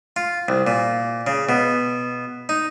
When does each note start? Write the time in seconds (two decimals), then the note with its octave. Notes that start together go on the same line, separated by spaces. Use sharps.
0.16 F4
0.48 C2
0.67 A#2
1.27 C#3
1.49 B2
2.49 D#4